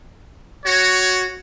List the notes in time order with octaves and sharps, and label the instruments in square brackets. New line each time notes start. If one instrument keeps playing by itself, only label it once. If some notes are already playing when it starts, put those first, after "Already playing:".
[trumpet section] F#4 C#5